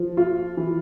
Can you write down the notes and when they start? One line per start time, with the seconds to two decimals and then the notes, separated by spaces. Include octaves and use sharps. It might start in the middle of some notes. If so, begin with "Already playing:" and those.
Already playing: F3
0.17 F4
0.57 E3